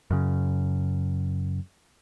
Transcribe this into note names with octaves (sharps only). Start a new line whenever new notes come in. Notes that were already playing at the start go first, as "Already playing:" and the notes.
F#2 C#3